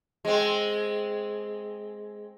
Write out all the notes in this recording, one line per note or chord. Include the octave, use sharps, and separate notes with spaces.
G#3 C4